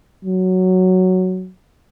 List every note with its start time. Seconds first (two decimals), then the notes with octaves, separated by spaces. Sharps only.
0.25 F#3